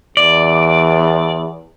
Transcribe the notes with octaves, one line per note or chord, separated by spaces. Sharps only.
E2 D5